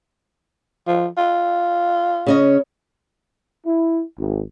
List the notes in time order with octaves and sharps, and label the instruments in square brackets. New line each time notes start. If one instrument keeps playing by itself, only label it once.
[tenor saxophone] F3
F4
[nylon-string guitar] C#3 C#4 D#5
[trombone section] E4
G#1